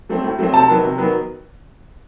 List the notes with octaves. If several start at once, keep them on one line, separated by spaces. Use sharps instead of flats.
F#3 A3 C4
A2
F#3 A3 C4
C3 A5
D#3 F#3 B3
C3
D#3 F#3 B3